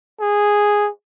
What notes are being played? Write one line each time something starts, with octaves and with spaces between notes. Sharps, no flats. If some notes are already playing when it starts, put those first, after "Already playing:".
G#4